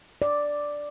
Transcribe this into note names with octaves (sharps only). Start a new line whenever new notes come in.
D5